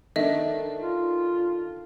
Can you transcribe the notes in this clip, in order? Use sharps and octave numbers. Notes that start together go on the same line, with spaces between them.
D#3 D4 A4 D#5 E5
F4